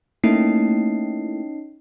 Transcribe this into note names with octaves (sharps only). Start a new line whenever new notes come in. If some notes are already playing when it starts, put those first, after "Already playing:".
A3 A#3 C#4 D#4 E4 C7